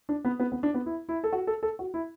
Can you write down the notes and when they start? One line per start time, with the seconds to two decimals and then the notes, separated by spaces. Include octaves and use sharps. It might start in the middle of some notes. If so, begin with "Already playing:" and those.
0.09 D4
0.25 B3
0.40 B3
0.52 B3
0.63 D4
0.74 B3
0.86 E4
1.09 E4
1.24 A4
1.33 F#4
1.47 A4
1.63 A4
1.79 F#4
1.94 E4